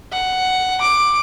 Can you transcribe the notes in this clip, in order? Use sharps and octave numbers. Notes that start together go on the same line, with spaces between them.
F#5
D6